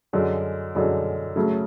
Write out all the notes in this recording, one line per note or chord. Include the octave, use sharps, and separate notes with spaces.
F#2 D3 G#3
F#2 D3 G#3
C#3 F#3 A3